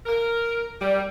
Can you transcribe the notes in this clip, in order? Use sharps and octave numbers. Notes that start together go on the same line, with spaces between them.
A#4
G3